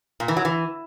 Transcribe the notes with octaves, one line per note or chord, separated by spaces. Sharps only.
A#2
E3
F#3
E3